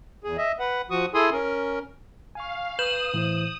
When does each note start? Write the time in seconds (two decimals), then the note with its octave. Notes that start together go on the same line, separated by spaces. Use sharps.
0.24 E2 G#4
0.38 D#5 E5
0.60 B4 F#5
0.91 F3 F#4 C#6 D#6
1.14 E4 G#4 A4 G#5 C6 D#6
1.32 C#4 A#4
2.35 F5 G#5 C#6
2.79 B4 D#6 G6 E7 F#7
3.14 A2 E3 E4 C5